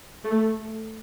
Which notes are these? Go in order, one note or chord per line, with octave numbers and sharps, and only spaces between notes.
A3